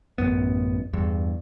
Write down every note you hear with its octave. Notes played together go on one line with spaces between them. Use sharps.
A1 F#2 B3
E2 G2